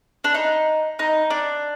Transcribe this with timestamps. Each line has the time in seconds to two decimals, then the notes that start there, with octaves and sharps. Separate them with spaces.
0.24 D4
0.34 D#4
0.99 D#4
1.30 D4